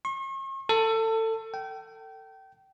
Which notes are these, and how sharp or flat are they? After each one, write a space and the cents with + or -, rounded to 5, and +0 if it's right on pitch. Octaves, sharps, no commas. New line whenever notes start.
C#6 -45
A4 +25
G5 -25